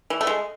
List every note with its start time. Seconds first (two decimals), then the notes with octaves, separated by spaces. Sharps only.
0.10 E3
0.21 A3
0.27 G#3